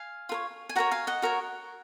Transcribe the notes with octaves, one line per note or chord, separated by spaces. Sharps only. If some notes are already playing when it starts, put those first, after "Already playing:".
Already playing: F5 G#5
F4 A#4 C#5
G#5
F#4 A#4 C#5 F#5 A#5
F5 G#5
D#5 F#5
F#4 A#4 C#5